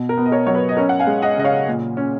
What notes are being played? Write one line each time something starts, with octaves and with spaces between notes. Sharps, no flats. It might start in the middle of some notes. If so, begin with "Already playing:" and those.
Already playing: B2
A#4
B3
D#5
A#4 C#5
F#3 C#5
B4
D#5
C#4 A#4 C#5
F#5
F5 G#5
G#3
D#5 F#5
C#3 D#5
C#5 F5
A#2
C#4